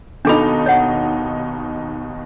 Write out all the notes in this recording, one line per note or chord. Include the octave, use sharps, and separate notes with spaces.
D#2 B2 D4 D#4 A4 B5
C#5 F#5